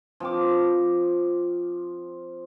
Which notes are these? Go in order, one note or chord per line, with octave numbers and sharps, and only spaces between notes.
F3 C4 D6